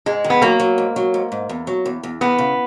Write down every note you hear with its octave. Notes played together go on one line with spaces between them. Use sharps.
G#2 G#3
D#3
B3
F#3 A#3
F#3
G#2
F#3
G#2
G#2
E2
F#3
E2
E2
E2 B3
C#3